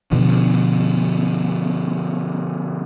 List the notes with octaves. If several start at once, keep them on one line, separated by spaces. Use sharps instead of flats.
B2 D3 F3